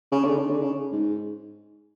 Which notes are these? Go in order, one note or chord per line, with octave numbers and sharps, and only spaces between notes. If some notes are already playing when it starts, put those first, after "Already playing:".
C#3
D3
C#3
D3
C#3
G#2